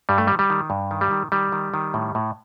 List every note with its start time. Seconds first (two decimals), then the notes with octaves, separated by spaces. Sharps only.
0.09 G2 G3
0.18 A3
0.27 D#3 G3
0.39 G3
0.50 D#3
0.70 G2
0.91 D#3
1.01 G3
1.11 D#3
1.32 D#3 G3
1.52 D#3
1.74 D#3
1.94 A2
2.15 A2